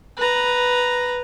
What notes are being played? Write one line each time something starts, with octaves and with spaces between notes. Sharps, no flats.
B4 A#5